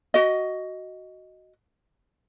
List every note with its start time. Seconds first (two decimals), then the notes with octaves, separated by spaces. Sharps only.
0.14 F#4 D#5